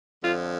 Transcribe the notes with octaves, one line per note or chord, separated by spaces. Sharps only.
F2 D3 F3 F4